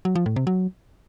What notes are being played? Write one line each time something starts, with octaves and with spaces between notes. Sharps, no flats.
F#3
F3
A2
C3
F#3